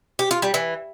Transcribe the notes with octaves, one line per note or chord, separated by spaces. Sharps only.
G4
F4
G3
E3